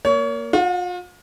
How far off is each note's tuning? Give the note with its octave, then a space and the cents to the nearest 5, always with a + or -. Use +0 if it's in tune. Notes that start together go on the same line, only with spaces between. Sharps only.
A#3 +0 C#5 +30
F4 +40 F#5 +0